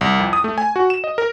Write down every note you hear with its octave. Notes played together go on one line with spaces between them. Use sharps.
C2
F2
D#6
A3
G#5
F#4
E7
D#5
A#4